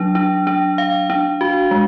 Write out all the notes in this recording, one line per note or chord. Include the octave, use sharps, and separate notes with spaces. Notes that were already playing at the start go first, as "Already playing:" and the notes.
Already playing: F#3 D4
D4
D4
F5
D4
F#4
G#3